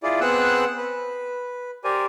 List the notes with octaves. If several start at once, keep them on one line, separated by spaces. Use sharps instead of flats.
E4 F4 G#4 D5
B3 C4 G#4 F#5 E6 F#6
B4
G4 A#4 C5 D5 G#5